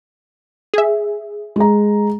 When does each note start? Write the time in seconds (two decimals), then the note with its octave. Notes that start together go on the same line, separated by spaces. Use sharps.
0.74 G#4 E5
1.56 G#3 A#5